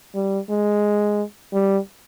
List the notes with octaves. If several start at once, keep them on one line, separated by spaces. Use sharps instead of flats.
G3
G#3
G3